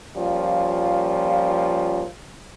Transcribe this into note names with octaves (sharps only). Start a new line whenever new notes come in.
F3 G3 A#3 C#4 F4